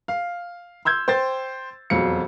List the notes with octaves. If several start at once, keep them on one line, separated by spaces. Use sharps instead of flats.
F5
C6 E6 G6 G#6
C5 G5 C6 A6
E1 F2 F#3 F5 C#7